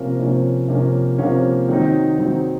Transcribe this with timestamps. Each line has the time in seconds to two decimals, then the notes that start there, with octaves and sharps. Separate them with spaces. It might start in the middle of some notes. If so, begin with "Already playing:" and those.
Already playing: C3 F3 A#3 C#4
0.19 C3 F3 A#3 C#4
0.68 C3 F3 A#3 C#4
1.18 C3 F3 A#3 C#4
1.68 D#3 F#3 C4 D#4
2.18 D#3 F#3 C4 D#4